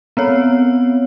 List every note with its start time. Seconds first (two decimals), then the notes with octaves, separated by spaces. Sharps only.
0.17 B3 C4 C#5